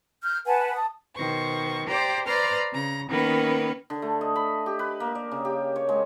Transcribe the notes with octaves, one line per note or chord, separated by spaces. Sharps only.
F6 G6
B4 F#5 G#5 A5
A5 D#6
B2 D#3 C5 C#6
G4 C5 D5 A#5 D6
B4 C5 D5 A#5 C6 F6
C#3 A#5
D#3 A#3 B3 C#4 A#4 B4
D3
A3
D#5
B5
G4
B4
A#3
D5
C#3
G4
C#5
G#3